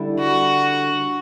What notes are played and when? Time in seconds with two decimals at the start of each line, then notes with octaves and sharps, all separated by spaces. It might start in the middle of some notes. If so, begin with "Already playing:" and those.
Already playing: D3 G3 E4
0.19 F#4